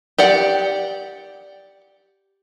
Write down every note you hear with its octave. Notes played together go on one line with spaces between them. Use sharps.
G4 D5 F#5